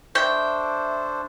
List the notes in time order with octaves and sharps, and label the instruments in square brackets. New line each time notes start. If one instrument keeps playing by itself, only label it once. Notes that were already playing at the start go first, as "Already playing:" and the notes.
[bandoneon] D4 A4 C5 [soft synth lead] E5 [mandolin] G5 [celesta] C#6